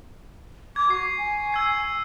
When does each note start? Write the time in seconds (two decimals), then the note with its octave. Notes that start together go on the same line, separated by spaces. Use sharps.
0.76 D6 G#6
0.89 F#4 C#6 C7
1.17 G#5
1.52 E6 G#6 C7